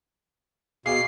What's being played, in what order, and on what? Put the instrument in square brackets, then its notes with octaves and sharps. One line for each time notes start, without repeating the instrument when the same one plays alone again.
[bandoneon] B2 [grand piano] G#4 F5 D6 [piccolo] C7